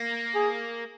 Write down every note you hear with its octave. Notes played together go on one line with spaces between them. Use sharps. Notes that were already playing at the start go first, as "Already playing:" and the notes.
Already playing: A#3
G#4